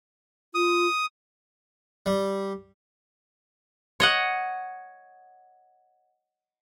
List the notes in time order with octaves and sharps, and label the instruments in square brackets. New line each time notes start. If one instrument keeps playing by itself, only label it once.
[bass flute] F4 [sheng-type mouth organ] D#6
[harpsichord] G3
[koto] C#5 D#5 F#5